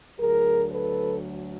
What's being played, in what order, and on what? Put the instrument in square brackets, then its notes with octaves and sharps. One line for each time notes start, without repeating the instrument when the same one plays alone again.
[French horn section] D2 D3 F#3 G#4 A#4
A4 B4